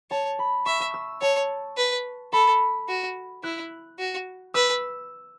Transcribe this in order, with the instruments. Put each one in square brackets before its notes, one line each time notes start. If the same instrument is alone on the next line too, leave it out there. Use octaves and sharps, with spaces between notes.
[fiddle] C#5 [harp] A5
[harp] B5
[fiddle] E5 [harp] C#6
[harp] E6
E6
[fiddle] C#5 [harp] A5
[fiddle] B4
[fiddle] A4 [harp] B5
[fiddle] F#4
[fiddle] E4 [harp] F#6
[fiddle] F#4
[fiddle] B4 [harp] E6